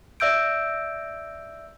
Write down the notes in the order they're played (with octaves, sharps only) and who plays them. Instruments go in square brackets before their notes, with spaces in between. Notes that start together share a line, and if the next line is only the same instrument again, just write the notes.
[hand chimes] D5 E5 E6 G6 D7